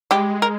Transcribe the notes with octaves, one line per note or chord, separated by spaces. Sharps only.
G3 G#3 G4
A#4